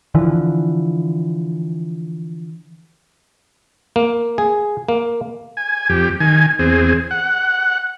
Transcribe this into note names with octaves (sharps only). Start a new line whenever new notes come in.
D3 E3 F3
A#3
G#4
A#3
G#5
F2 G4
D#3 G#5
E2 C4 G#4
F#5